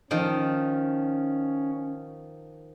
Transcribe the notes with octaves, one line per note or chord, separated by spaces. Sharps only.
D#3 F3 C#4